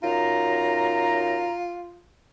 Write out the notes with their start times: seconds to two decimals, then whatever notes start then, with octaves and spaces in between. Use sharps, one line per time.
0.03 F#2 D#4 F4 A#5